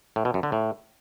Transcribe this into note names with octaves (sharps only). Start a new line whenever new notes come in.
A2
B2
F#2
D3
A2